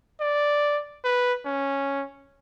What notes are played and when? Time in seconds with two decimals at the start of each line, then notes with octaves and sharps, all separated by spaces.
0.20 D5
1.04 B4
1.45 C#4